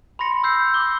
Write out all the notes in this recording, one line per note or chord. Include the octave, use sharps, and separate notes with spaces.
B5 C6 A#6 C#7
E6 G6 C7
D6 G7